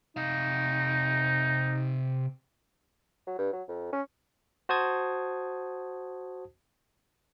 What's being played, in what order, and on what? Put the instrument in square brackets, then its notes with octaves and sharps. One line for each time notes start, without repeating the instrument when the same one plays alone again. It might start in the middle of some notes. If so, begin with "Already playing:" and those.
[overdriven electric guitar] C3 F5 [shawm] D#4
[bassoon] F#3
G2
F#3
F2
C#4
[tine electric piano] F#4 C5 A5 D#6 G#6